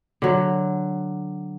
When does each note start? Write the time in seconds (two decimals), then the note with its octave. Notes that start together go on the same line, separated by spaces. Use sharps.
0.22 D3 F#3